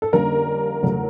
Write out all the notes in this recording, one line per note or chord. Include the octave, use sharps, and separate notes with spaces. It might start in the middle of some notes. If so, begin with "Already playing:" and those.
A4
F2 D3 G3 A#3 C#4 A#4
E2 C#3 F#3 A3